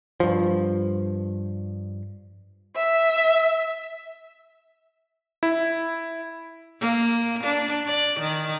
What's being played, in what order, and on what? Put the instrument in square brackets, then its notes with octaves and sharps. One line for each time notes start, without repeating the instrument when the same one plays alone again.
[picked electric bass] G2 F3
[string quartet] E5
[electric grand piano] E4
[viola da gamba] A#3
D4
D5
D#3